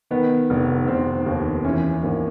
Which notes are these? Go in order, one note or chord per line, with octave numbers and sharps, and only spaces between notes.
D#3 B3
F1
F1 C4
D#2
E3 C#4
G#1 A#3